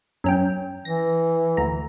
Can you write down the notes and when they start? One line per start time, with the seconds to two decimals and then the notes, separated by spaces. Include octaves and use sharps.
0.24 F#2 C#4 G5
0.85 E3 A#6
1.57 D2 A#5